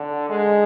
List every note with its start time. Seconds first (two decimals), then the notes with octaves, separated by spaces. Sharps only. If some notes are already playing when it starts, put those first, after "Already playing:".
Already playing: D3
0.30 G#3